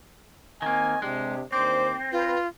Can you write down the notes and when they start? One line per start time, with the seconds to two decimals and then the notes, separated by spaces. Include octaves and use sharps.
0.62 D#3 A#3 C4 D#5 G#5
1.02 C3 G#3 D4 G4
1.52 D#2 C4 D4 C5 D6
2.12 F4 B4